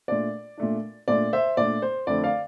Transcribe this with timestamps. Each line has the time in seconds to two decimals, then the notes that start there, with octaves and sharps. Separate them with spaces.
0.08 A#2 A3 D4 D5
0.58 A#2 A3 D4
1.08 A#2 A3 D4 D5
1.33 C5 E5
1.57 A#2 A3 D4 D5
1.82 C5
2.07 F2 D3 A3 D4 D5
2.24 D5 F5